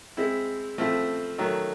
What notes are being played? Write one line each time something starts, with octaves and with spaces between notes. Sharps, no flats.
G#3 C4 E4
F3 A3 C4 E4
D#3 F#3 A3